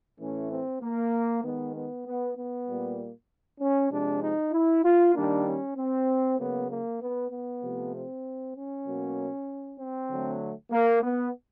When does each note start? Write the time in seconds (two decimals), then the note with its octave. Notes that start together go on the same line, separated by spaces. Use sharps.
0.19 A2 E3 A3 C#4
0.50 C4
0.81 A#3
1.43 D#3 G#3 B3
1.74 B3
2.05 B3
2.36 B3
2.67 A#2 G3 A#3
3.60 C#4
3.90 C3 F3 G#3 D4
4.22 D#4
4.52 E4
4.83 F4
5.14 D#3 G3 A#3 D4
5.45 C#4
5.76 C4
6.38 C#3 F#3 A#3 B3
6.69 A#3
7.00 B3
7.30 B3
7.62 C3 F3 A3
7.92 C4
8.54 C#4
8.86 B2 F#3 A#3
9.78 C4
10.09 D3 F#3 A3
10.71 A#3
11.02 B3